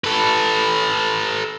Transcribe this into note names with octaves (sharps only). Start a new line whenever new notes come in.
A4 B4